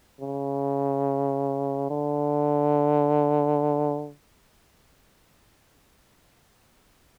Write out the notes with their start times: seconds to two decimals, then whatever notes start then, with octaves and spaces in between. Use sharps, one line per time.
0.20 C#3
1.90 D3